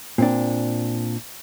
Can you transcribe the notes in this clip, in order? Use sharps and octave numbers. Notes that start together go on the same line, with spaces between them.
A#2 C4 D4